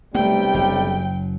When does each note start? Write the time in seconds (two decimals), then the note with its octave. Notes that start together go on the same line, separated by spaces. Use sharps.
0.15 B1 C3 G3 A3 A#3 G5
0.54 F#1 F#3